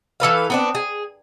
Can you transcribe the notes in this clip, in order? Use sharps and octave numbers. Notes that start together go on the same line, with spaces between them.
E3 A4 B4 F5
B3 C4 D4
G#4